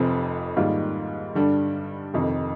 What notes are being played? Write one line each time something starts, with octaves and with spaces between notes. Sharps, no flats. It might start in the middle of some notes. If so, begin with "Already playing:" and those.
Already playing: F1 F2 C3 F3 C4
G#2 D#3 G3 A#3 F4
G2 D3 G3 D4
F1 F2 C3 D#3